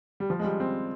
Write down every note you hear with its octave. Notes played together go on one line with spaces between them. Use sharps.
G3
F3
G#3
G3
C4